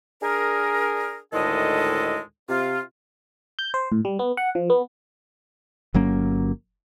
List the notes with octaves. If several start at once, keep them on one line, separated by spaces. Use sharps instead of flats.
D4 G#4 A#4
D2 A2 D#3 G#3 A4 D#5
C3 F4
G6
C5
A2
G3
B3
F#5
F3
B3
G1 F#3 A#3 C#4